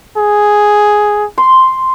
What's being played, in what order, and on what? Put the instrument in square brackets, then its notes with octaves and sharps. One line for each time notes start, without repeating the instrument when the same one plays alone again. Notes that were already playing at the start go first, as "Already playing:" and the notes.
[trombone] G#4
[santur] C6